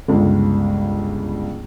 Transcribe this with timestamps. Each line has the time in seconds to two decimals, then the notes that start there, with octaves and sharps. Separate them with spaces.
0.08 G1 C#2